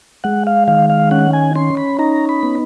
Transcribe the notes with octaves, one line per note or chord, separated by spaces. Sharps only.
G#3 F#5
F5
D#3 F5
F5
C#4 F#5
G#5
C#4 C6
B5
D#4 A#5
B5
B3